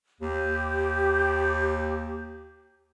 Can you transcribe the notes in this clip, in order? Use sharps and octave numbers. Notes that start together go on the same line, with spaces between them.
D#2 G4